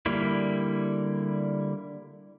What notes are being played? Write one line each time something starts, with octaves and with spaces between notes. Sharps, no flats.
D3 G3 A#3 E4